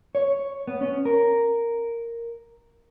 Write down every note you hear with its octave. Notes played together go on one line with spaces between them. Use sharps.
C#5
B3
C#4
A#4